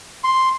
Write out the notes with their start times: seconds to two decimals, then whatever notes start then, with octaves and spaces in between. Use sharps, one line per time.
0.24 C6